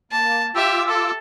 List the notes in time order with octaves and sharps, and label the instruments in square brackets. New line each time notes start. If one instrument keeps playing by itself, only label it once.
[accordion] A#3 [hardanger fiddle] A5
[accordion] F4 D6 E6 [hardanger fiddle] G4 E5
[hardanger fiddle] A4